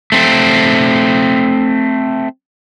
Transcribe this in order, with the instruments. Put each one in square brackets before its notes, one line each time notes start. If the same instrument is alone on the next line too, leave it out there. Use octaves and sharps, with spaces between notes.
[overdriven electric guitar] A3 C4